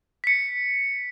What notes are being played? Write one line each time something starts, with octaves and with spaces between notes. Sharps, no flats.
B6 C#7